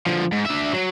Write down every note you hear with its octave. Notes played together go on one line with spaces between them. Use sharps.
D3 F3
G#2
D4 E5
F#3